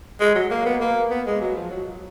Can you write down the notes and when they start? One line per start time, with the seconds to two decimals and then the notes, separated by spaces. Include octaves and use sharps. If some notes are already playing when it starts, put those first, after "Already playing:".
0.20 G#3
0.35 F#3
0.51 A#3
0.66 B3
0.81 A#3
1.11 B3
1.27 G#3
1.41 F#3
1.56 F3
1.71 F#3